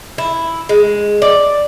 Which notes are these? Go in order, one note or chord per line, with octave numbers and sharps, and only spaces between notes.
E4
G#3
D5